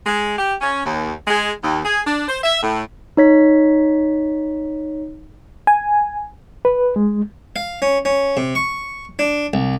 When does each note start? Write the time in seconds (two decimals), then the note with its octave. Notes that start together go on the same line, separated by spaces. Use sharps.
0.06 G#3
0.39 G4
0.61 C#4
0.85 D#2
1.27 G#3
1.63 D#2
1.84 G#4
2.05 D4
2.27 C5
2.44 E5
2.62 A2
3.17 D#4 C#5 B6
5.67 G#5
6.65 B4
6.96 G#3
7.56 F5
7.82 C#4
8.05 C#4
8.37 C3
8.55 C#6
9.19 D4
9.53 C2